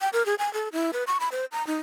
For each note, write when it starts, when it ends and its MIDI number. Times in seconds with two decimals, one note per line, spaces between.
0.01 0.09 79
0.13 0.25 70
0.26 0.35 68
0.39 0.52 80
0.54 0.69 69
0.73 0.91 64
0.93 1.04 71
1.07 1.18 85
1.20 1.29 83
1.32 1.45 72
1.52 1.65 82
1.67 1.76 63